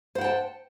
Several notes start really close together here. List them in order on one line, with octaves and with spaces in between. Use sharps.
C5 F#5 G5 A5